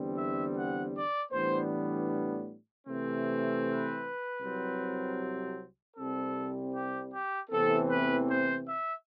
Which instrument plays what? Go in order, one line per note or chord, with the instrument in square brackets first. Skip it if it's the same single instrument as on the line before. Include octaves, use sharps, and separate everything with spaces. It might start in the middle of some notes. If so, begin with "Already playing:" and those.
Already playing: [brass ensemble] E2 D3 G3 C4
E5
F#5
D5
A2 E3 G3 B3 D4 C5
C3 E3 A3 C4
B4
C2 C3 F#3 C4
C2 C3 G3 C4 A4
G4
G4
E2 C3 E3 A3 C4 A4
B4
C5
E5